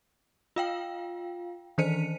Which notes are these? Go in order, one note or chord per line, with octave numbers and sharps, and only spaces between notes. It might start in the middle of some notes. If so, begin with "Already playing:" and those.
F4 F5 G5
D#3 E3 C5 C#7 D#7